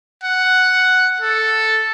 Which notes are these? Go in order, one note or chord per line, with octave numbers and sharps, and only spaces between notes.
F#5
A4